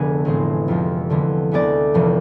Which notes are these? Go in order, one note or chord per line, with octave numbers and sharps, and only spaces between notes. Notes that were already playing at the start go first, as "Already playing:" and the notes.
Already playing: F1 F2 D3 G#3 B3 D4 G#4
A1 A2 G#3 C4
F2 C3 F3 G#3
E2 D3 F3 G#3 B3
D2 D3 G#3 B3 D5
F1 F2 E3